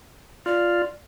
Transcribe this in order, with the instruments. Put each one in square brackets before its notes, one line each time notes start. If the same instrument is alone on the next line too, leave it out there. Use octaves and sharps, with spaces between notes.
[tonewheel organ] F4 [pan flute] D5